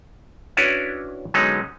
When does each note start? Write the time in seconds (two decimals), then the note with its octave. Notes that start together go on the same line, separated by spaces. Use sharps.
0.57 C#4 D4 E4 F#4 B4 C#5
1.34 D3 F#3 G#3 B3 C#4 D#4